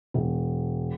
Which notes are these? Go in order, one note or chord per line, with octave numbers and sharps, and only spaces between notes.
E1